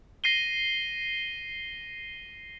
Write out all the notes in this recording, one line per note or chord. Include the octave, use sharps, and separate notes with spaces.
A#6 C7 D#7 G7